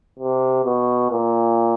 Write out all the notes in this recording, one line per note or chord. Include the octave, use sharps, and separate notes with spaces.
C3
B2
A#2